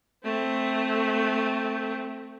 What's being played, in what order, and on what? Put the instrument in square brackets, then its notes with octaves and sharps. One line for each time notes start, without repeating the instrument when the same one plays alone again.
[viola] A3 C4